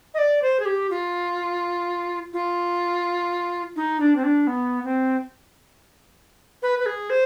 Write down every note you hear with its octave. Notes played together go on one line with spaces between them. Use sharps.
D#5
D5
C5
G#4
G4
F4
F4
D#4
D4
C4
D4
B3
C4
B4
B4
G#4
C5